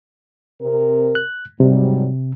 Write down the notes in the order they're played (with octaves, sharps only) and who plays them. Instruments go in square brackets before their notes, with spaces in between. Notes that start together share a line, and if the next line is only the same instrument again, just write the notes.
[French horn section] C3 C4 A#4
[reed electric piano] F#6
[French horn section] G#2 F#3 G3 [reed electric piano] C3